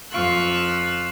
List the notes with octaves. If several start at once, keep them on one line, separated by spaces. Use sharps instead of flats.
F2 F4 F5 C#6 E6 F#6